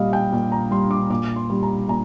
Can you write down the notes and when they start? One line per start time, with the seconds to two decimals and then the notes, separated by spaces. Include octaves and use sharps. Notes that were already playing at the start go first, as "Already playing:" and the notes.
Already playing: A#2 G3 D#5 F5
0.13 G5
0.32 A#2
0.52 A#5
0.71 G3 C6
0.91 D6
1.10 A#2 D6
1.36 C6
1.50 G3
1.63 A#5
1.88 A#2 A#5